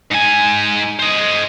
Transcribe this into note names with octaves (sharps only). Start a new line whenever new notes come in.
G#2 G#5
C5 D#5